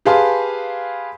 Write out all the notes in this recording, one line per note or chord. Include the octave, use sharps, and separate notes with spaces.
G4 G#4 B4 F5 A5 C6